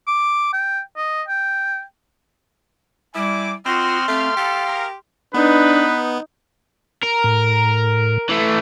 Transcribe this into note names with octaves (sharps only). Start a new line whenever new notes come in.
D6
G5
D#5
G5
G3 C4 E4 G#5 D6
C4 F4 F#4 D#5 C6 F6
A3 C4 F4 G4 F5
G4 A4 F5
G#4 A#4
B3 D4 D#4 B4
A#4
A2
E3 A3